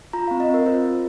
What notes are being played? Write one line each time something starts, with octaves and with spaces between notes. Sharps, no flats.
F4 A#5
F5
C4
D#5
C4 A#4
F4 C5
F4